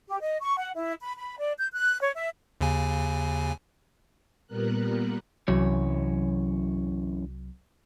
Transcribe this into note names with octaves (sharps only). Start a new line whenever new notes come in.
G4
D#5
C#6
F#5
E4
B5
B5
D5
G6
F#6
C#5
E5
D#2 C#3 G#5
A#2 G3 B3 A#4 F#6
C2 F#2 C3 E3 F#3 C#5